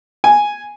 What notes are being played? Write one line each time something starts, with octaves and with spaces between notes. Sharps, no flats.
G#5